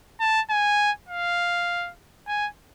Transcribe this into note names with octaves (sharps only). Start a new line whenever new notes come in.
A5
G#5
F5
G#5